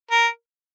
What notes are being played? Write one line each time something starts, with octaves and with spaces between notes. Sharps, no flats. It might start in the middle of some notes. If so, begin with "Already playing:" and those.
A#4